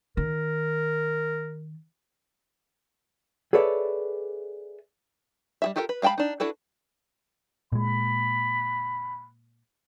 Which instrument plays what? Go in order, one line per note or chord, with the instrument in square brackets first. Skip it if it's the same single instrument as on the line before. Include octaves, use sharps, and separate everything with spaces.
[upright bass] D#3 [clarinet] A#4
[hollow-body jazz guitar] G#4 A4 B4 C#5 D5 E5
[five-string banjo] G3 G#4 E5
F4 G4 A4 A#4 G5
B4
G#3 F5 G5 A5 B5
D4 D#4
D4 E4 F#4 A4 B4
[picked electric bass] A#2 G#3 [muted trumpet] B5